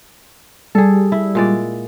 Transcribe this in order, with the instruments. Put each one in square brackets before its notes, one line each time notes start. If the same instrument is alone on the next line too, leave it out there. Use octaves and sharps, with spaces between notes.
[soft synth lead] G3 [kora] G#4 A4
[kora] E4
A#2 G#3 D5